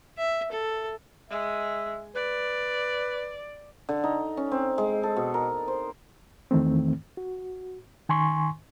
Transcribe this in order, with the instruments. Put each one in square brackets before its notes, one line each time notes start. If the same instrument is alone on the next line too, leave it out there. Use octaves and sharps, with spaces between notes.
[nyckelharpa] E5
A4
[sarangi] G#3 [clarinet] E5
[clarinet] B4 [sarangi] D5
[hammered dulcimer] D3
D#4
C#4
C4
G#3
A4
B2
A#4
C5
[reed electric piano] E2 D#3 E3 A3 C4
F#4
D#3 G#5 C6 C#6